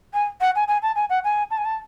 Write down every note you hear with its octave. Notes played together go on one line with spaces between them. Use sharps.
G#5
F#5
G#5
G#5
A5
G#5
F#5
G#5
A5
G#5
A5